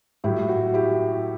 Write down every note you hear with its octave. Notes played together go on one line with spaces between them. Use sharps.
A2 F#3 E4 G4
F#4
E4 G4